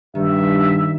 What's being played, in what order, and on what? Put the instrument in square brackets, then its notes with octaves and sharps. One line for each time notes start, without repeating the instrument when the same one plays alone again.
[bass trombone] G2 [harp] D#3 [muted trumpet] E5